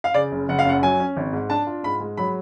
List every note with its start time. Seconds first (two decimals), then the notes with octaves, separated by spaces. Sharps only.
0.04 F5
0.14 C#3 D5
0.32 F#1
0.49 F#1 F#5
0.59 F5
0.65 F#2 F#5
0.83 F#3 G#5
1.00 C#4
1.17 G#1
1.33 G#2
1.50 D4 A5
1.67 F4
1.83 G#2 B5
2.00 G#3
2.17 F#3 B5